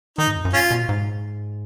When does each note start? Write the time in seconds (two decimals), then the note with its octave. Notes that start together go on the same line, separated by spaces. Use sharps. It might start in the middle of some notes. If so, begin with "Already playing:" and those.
0.18 D#3 D#4
0.27 G#2
0.36 F2
0.45 F#2
0.53 G#2 C#4 F4
0.71 B2
0.79 A#2
0.89 G#2